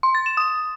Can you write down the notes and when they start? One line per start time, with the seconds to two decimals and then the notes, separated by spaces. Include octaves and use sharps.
0.03 C6
0.15 A6
0.26 E7
0.37 D#6